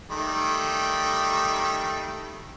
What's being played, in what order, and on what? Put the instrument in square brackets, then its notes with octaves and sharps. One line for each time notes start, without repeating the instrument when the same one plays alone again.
[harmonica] D#3 G3 A3